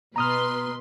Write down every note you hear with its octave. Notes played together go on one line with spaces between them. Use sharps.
B2 B4 A#5 C6 D#6 F6